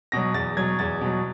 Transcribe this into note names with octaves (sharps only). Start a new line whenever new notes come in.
B2 F#3 A#6
E2 A6
B2 F#3 G#6
E2 A6
B2 F#3